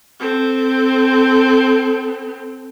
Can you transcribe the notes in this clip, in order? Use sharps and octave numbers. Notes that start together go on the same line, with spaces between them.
C4 A4